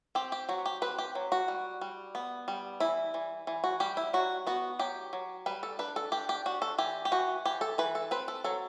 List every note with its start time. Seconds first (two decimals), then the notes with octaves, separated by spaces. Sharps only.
0.15 C4 G4
0.32 G4
0.49 F#3 F#4
0.66 G4
0.82 C4 B4
0.98 G4
1.15 F#3
1.32 F#4
1.48 G3
1.81 G3
2.15 B3
2.48 G3
2.80 E3 E4
3.14 E3
3.47 E3
3.64 F#4
3.80 G3 G4
3.97 E4
4.13 F#3 F#4
4.47 B3 F#4
4.79 F#3 G4
5.13 F#3
5.46 G3 B4
5.63 A4
5.79 D4 B4
5.96 A4
6.12 D4 G4
6.29 G4
6.46 D4 F#4
6.62 A4
6.79 E3 G4
7.05 G4
7.12 E3 F#4
7.45 E3 G4
7.61 A4
7.78 E3 B4
7.95 A4
8.11 C4 B4
8.28 A4
8.44 F#3 A4